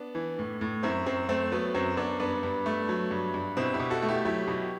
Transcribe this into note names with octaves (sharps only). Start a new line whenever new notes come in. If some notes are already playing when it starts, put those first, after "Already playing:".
Already playing: B3 D4
E3
A2
A2
F#2 C4 E4
F#2 C4
A3 C4
F#3 B3
F#2 C4
F#2 B3 D4
G2 B3 D4
G2
A3
F#3
G2
G2
B2 C4 E4
E4 G4
B2
F#4 A4
A3
E4 G4
F#3 E4 G4
B2